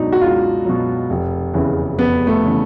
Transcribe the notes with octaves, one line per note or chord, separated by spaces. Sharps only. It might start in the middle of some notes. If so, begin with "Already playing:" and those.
Already playing: C#2 B2 F#3 D4 D#4
F#4
C#2 F4
B2 F#3
F1
E2 C#3 E3
F1 B3
A3
C#3 E3